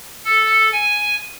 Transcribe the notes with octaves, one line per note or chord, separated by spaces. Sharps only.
A4
G#5